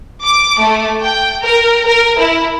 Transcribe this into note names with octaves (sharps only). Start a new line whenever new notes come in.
D6
A3
G5
A#4
A#4
E4